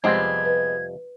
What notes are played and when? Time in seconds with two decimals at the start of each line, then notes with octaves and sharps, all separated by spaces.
0.04 F2 C3 G3 G#3 B3 C4 G#6
0.45 B4